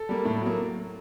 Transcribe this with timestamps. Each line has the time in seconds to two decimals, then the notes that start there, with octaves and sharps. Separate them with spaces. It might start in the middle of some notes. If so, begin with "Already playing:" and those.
Already playing: A4
0.09 G3 A#3
0.25 A2
0.42 F#3 A#3